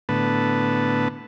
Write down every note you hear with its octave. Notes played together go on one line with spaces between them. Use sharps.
A2 D3 B3 B4 A5